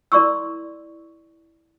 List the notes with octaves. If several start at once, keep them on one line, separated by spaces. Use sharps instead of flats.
E4 A#4 D5 C6 C#6 E6